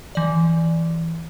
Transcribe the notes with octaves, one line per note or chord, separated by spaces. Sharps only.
E3 D5